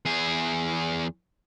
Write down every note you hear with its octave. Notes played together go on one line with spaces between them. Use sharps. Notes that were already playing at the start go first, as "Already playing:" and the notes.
E2 G#4